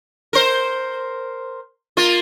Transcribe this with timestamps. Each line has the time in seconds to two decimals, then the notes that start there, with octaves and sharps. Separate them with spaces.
0.33 A#4 C5
1.97 A#3 F4